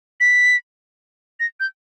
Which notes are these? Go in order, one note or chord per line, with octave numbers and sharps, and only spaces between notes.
B6
A#6
G6